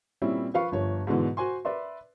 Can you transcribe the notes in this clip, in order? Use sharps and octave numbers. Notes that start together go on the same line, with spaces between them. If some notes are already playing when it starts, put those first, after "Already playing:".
A#2 G3 C4 C#4 E4
F3 F4 B4 F5 C#6
G1 F3 C#5
G#2 B2 D3 E3
F#4 C5 G#5 C6
B4 D5 E5 C6